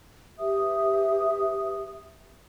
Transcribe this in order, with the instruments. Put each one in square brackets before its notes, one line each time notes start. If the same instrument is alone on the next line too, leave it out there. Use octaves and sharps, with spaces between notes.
[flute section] G4 B4 E5 D#6